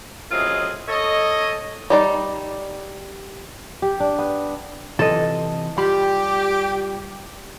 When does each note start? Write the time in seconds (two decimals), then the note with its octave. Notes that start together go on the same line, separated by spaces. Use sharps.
0.31 F#2 A2 C4 F4 G#4 D#5
0.89 A4 C#5 D#5
1.90 G3 D#4 D5
3.82 G4
4.00 D4
4.19 B3
4.99 C3 E3 F4 A4 D#5
5.78 G3 F4 G4 B5